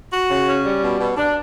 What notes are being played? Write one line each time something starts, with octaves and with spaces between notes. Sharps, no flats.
F#4
C#3
C#4
G3
B2
B2
D4